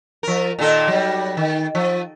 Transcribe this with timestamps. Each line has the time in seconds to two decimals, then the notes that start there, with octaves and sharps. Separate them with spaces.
0.23 F3 A#4
0.59 A#2 D#3 A4
0.88 F#3 G3
1.37 D#3
1.75 F3